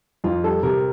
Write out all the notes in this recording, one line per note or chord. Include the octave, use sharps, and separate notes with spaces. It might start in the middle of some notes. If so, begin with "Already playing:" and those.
F2 F4
G3 A4
C3 A#4